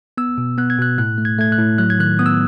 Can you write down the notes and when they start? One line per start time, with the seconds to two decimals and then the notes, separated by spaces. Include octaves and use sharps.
0.18 B3 E6
0.38 B2
0.58 B3 F#6
0.70 G#6
0.79 B2 F#6
0.98 A2 F#6
1.18 A3
1.25 G#6
1.39 A3 G#6
1.52 F#6
1.58 A2
1.78 F#3 F#6
1.90 G#6
1.99 D#3 F#6
2.19 B3 D#6
2.26 E6